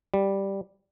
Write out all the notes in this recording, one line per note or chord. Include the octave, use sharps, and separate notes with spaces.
G3